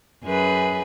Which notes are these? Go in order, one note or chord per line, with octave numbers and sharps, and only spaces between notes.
F#2 G#4 B4